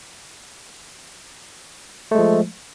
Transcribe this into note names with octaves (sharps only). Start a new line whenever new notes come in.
F3 G#3 A3